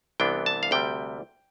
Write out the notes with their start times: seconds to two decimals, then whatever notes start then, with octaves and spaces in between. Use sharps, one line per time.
0.20 C2 C3 E3 B3 D4 G5
0.46 A5
0.63 F5
0.71 D2 C3 G3 G5